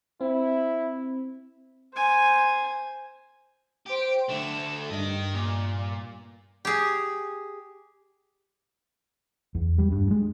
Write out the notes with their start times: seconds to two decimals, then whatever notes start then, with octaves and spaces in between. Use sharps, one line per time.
0.21 C4 E4
1.94 C5 G#5
3.86 G4 C5 D7
4.29 D3 A3 E7
4.90 G2 A#4 D#5
5.34 A#2
6.65 G4 G#4
9.55 E2
9.78 G3
9.92 G2
10.11 G#3